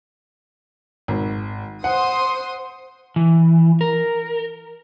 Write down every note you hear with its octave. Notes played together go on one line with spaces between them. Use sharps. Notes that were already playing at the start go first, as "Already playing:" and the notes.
G#1
C5 F#5 C6 D#6
E3
A#4